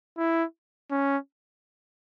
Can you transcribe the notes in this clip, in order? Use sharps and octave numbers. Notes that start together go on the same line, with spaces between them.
E4
C#4